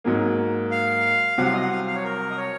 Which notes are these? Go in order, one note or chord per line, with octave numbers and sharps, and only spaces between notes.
G#2 F#3 A#3
F5
C2 C3 F#3 C4 F#5
F5
D#5
F#5
F5
F5
C#5
A#4
D#5
C#5